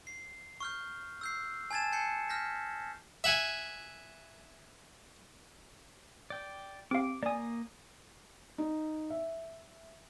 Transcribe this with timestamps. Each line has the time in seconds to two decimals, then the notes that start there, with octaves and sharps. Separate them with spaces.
0.07 C7
0.60 C#6 F6 G6
1.21 E6 G6 C7
1.71 G#5 A5 G#6 A6 E7
1.92 G#5 A5 G6 C7 C#7
2.29 F6 G6 A#6 B6
3.24 E5 F#5 G#5
6.30 D5 G5
6.91 C4 G4 F5 D6
7.23 A#3 D5 G#5 D#6
8.58 D#4
9.10 E5